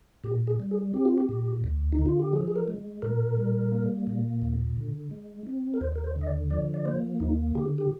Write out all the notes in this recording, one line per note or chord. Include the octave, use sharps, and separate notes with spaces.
A#2 G4
G#4
G3
G#4
C4 G4
F4
G4
A#2
D2
D#4
D3
F4
G4
F3 G#4
G#4
A#4
G#3
A#2 A#4
G3
A#3
A#2
D#2
D3
G#3
C4
A#4
D#2 C5
A#4
C5
D3
D#5
D5
F3 D5
D5
A#3 C5
D#2 D#4
D3 G4
G4